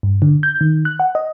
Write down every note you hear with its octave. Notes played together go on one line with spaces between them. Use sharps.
G2
D3
G6
D#3
F#6
F#5
D#5